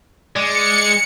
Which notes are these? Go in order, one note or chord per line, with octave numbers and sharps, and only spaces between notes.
G#3 D5 C#7